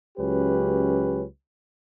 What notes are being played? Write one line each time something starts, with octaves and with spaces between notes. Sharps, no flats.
C#2 F#3 C#4 G4 B4